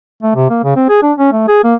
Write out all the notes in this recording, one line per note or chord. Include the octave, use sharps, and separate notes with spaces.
A3
C3
A#3
C#3
C4
G#4
D4
C#4
A3
G#4
A#3